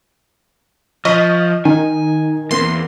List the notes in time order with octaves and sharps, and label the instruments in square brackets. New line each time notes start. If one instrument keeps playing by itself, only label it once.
[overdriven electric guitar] F3 [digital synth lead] D#5 [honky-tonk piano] C#6 F6 B6
[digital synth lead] D#3 [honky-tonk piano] D#4 [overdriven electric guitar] G#5
[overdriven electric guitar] E2 [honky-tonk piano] A#3 C4 [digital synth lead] C6